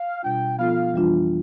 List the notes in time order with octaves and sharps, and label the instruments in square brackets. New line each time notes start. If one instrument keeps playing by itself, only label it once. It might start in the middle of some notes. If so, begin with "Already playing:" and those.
Already playing: [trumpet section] F5
[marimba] B2 G3 D4 F4 [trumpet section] G5
[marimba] F3 B3 F4 A4 [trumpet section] F5
[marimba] F2 E3 G3 D4 F4